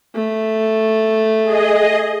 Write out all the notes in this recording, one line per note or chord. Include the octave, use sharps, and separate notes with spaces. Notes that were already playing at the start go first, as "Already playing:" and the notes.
A3
G#4 D#5